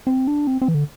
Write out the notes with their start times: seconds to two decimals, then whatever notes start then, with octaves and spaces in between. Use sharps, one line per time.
0.07 C4
0.27 D4
0.47 C4
0.62 C4
0.68 E3
0.74 D3